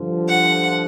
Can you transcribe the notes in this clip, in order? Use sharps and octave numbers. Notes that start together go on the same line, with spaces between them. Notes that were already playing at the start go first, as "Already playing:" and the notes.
Already playing: G2 D3 F3
F#5